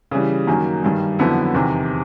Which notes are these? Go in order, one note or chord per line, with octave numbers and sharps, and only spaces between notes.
C#3 E3 G3
F#2 D#3 F#3 A#3
G2 D#3 G3
F2 D3 F#3 B3 E4
E2 C3 D#3